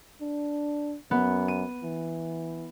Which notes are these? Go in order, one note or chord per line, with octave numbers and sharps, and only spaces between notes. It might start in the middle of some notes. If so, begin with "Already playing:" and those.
D4
F#2 B3
D#7
E3